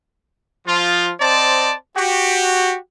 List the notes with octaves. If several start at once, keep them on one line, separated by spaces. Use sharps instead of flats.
F3 F4
C4 C5 D5 D#5 A5
F#4 G4